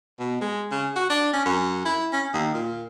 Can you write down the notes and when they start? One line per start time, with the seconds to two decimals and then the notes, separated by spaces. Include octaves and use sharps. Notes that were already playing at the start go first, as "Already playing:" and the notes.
0.19 B2
0.41 G#3
0.71 C#3
0.96 F#4
1.10 D4
1.33 C#4
1.45 F#2
1.85 E4
2.13 C#4
2.33 D#2
2.54 A#2